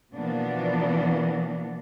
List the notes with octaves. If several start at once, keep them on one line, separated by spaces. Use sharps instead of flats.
B2 E3 F3 A#3 B3 D4